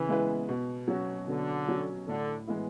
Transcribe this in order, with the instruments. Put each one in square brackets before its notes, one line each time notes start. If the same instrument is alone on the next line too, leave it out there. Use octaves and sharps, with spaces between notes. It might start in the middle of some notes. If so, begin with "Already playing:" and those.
Already playing: [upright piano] C#3 [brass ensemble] E3
[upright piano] G#3 B3 E4 B4
B2
F#3 C#4 F#4
[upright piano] B2 [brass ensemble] D3
[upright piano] F#3 C#4 F#4
[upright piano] A2 [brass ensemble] D3
[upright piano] E3 G#3 B3 E4